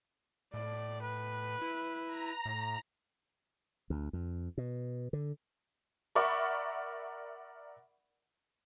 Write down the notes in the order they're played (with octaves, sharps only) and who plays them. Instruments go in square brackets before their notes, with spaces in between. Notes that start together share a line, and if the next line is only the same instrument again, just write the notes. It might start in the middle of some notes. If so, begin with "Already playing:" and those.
[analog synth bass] A2 [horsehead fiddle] D5
[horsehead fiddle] B4
[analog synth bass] E4
[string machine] A#5
[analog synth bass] A2
[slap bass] D2
F2
B2
D3
[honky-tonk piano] A#4 D5 E5 F#5 B5 C#6